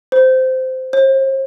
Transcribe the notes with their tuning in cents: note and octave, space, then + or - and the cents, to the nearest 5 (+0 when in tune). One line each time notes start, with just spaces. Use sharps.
C5 -10
C5 +40